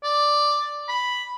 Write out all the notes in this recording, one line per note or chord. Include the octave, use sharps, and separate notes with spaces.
D5
B5